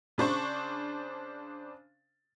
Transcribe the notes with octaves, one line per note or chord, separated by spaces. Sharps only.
C#3 D4 C5 C#6